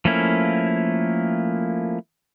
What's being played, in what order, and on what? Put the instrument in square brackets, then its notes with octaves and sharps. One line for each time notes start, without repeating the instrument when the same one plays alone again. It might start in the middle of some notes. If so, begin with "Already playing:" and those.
[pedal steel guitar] F3 A3 A#3 C#4 E4